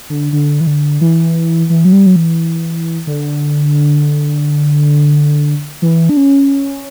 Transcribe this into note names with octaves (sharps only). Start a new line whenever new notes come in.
D3
D3
E3
D3
E3
E3
F#3
G3
F#3
E3
D3
E3
D4
C#4